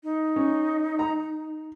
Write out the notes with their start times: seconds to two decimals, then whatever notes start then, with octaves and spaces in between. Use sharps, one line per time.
0.04 D#4
0.36 C#4
0.99 A#5